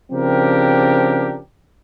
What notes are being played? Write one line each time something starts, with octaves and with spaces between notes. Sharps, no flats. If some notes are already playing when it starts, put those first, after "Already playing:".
C#3 F3 C4 D4 G4 A#4